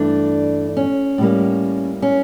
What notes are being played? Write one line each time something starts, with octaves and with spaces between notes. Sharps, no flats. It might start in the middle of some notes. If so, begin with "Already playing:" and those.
Already playing: G2 E3 A3 D4
C#4
A2 G3 A#3
C#4